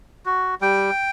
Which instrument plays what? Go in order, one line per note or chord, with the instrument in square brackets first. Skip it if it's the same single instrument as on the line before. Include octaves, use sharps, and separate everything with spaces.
[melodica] F#4
G3 G5